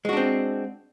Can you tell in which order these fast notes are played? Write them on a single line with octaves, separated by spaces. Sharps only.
G#3 F#4 D4 C4